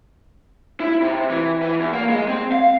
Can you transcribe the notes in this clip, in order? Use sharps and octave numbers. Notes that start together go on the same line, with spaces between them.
E4
C3
E3
E3
E2
A#3
G#3
C4
F5